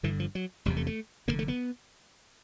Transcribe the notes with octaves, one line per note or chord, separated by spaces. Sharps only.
G1 G2 D3 E3
F3
F#3
F1 E2 C3 G3
A3
A3
F1 D#2 D3 A#3
A3
B3